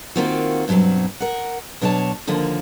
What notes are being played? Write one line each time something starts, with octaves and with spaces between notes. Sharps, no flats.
D#3 A#3 C4 F4 F#4
G2 B2 F3 F#3 C4
A#4 F#5
B2 F#3 D4 C#5 D5 A5
D#2 D3 F3 A#3